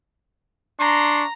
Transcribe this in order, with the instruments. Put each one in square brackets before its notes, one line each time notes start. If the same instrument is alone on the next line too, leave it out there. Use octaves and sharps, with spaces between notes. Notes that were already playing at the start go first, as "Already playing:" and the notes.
[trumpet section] D4 C6 C#6 [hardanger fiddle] A#5